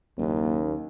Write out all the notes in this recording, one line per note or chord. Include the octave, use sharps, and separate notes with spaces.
F#1 D#2